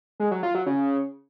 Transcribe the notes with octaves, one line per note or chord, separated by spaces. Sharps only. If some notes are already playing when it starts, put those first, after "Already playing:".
G#3
F#3
F4
F#3
C#3